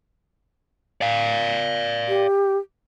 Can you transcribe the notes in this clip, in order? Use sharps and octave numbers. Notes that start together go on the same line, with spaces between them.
D5 F5
G4